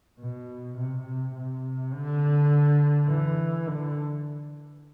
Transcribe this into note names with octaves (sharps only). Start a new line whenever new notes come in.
B2
C3
C3
C3
D3
E3
D3